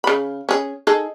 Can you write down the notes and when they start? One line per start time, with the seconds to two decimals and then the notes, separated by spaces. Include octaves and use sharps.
0.04 C#3 B5
0.49 C#4 G#4
0.87 D#4 G#4 A4